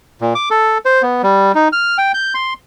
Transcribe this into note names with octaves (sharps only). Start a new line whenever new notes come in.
A#2
D6
A4
C5
B3
G3
D#4
F6
G5
G6
C6